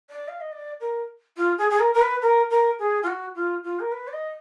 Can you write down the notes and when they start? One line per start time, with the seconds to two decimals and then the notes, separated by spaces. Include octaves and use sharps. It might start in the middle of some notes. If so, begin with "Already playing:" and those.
0.09 D5
0.28 F5
0.40 D#5
0.52 D5
0.80 A#4
1.37 F4
1.58 G#4
1.70 G#4
1.79 A#4
1.94 A#4
2.01 B4
2.22 A#4
2.50 A#4
2.79 G#4
3.03 F4
3.07 F#4
3.35 F4
3.64 F4
3.80 A#4
3.92 B4
4.07 D5
4.13 D#5